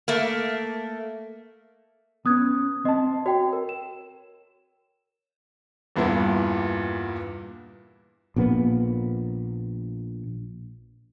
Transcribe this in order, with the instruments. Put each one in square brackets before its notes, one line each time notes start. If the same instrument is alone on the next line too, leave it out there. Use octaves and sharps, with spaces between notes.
[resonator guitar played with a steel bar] A3 A#3
[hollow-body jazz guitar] B3 C#4 [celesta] D#6 F#6 G#6
[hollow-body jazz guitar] C4 A5 [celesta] D#5
[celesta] F#4 G5 [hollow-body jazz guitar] C#5
[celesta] A#4
E7
[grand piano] E2 G2 A#2 B3 E4
[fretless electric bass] A#1 A#2 A#3 B3